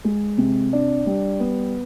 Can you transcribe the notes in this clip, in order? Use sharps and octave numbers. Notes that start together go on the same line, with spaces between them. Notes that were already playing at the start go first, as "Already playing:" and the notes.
G#3
C3
D4
G3
B3